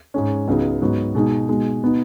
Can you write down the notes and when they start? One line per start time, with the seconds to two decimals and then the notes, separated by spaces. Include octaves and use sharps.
0.14 G#2 G#3 C#4
0.48 C#2 C#3 F#3 B3 D#4
0.81 G#2 F#3 B3 D#4
1.15 B2 G#3 D#4
1.48 B2 G#3 D#4
1.83 B2 B3 D#4